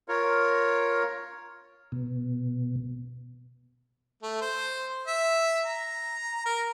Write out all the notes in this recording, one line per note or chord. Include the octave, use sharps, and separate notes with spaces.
F4 A#4 C#5
B2
A3
C5
E5
A#5
A#4